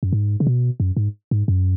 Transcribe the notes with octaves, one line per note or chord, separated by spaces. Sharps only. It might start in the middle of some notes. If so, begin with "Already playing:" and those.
F#2
G#2
C#3
B2
F#2
G#2
G#2
F#2